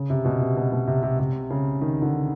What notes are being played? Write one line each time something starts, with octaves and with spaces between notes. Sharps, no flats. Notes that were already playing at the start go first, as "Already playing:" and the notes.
Already playing: C#3
C3
B2
C3
B2
B2
C3
C3
C3
C#3
D#3
D3